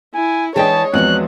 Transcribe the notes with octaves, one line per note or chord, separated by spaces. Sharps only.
E4 G#5
E3 G#3 D4 E4 C#5 D#5 G5 A5
E2 F3 G#3 B3 C4 F#4 F#6